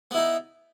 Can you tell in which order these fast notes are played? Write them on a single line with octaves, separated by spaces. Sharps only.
B3 E4 D#4